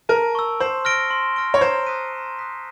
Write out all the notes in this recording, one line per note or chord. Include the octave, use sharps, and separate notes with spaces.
A#4 A5
C#6 E6
C5 C6
F6 A#6 D7 G7
C6
F6 A#6 D7 G7
C#5
C5 A#5
D#6 F#6 B6 D#7
A#5
D#6 F#6 B6 D#7